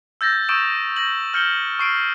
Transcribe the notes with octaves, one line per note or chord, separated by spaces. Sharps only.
E6 G6 A6 A#6
C#6 D#6 E6 G6 D7 E7
G6 A#6 F#7
F6 G6 C#7 E7 G7
C#6 C7 D7